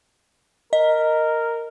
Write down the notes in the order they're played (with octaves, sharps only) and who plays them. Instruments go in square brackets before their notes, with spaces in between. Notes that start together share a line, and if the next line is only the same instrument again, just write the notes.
[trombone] A#4 [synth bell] D#5